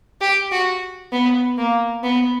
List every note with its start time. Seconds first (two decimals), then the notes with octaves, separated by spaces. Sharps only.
0.21 G4
0.52 F#4
1.12 B3
1.58 A#3
2.03 B3